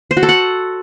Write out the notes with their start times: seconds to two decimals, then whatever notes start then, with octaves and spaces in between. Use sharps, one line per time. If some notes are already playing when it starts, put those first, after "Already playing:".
0.11 C5
0.17 F#4
0.23 A4
0.29 F#5